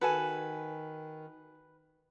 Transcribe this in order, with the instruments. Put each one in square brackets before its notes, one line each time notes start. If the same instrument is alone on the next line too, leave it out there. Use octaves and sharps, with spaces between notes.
[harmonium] D#3 [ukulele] F#4 A4 G#5 [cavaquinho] B4